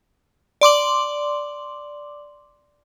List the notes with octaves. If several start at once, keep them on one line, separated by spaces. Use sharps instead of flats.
D5 C6 D6 F#7